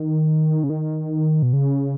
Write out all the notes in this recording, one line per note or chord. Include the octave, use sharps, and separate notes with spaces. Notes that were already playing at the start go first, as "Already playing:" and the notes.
Already playing: D#3
C#3
D#3
B2
C#3